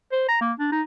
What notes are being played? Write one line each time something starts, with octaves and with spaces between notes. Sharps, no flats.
C5
A#5
A#3
D4
D#4